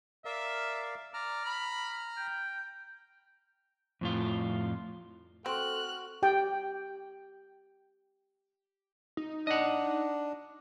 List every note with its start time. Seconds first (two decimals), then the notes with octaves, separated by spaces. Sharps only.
0.25 A#4 D5 E5 F5
1.14 D5 A#5 F6
1.45 B5
2.17 G5
4.01 F2 A2 F4
5.46 C4 F#4 A4 F6 F#6
6.23 G4 G5
9.17 D#4
9.47 D4 D#5 F#5